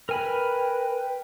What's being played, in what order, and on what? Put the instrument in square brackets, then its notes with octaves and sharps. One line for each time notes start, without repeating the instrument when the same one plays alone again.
[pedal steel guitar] A#4 G#5 B5 [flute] B4 [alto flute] G5